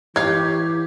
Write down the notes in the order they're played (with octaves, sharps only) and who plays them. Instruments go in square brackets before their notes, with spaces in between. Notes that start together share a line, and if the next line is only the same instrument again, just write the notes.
[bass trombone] E3 [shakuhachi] G4 [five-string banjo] C#5 F5 [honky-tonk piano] G#6